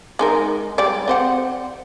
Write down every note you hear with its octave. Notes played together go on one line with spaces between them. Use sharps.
G#3 D#4 A#4
G3 G#3 D5
C4 C5 F#5